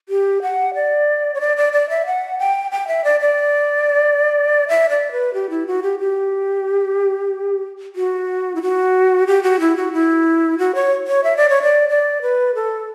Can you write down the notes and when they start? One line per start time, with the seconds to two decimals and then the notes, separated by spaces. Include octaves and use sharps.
0.09 G4
0.42 F#5
0.74 D5
1.34 C#5
1.41 D5
1.57 D5
1.73 D5
1.89 E5
2.06 F#5
2.39 G5
2.71 G5
2.88 E5
3.04 D5
3.20 D5
4.68 E5
4.90 D5
5.12 B4
5.34 G4
5.50 E4
5.67 F#4
5.83 G4
6.00 G4
7.96 F#4
8.55 E4
8.62 F#4
9.27 G4
9.43 F#4
9.60 E4
9.76 F#4
9.93 E4
10.58 F#4
10.75 C#5
11.08 C#5
11.24 E5
11.37 D5
11.49 C#5
11.63 D5
11.89 D5
12.22 B4
12.55 A4